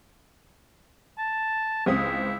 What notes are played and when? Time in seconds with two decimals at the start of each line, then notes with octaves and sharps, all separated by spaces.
1.18 A5
1.86 C#2 C4 E4 D#6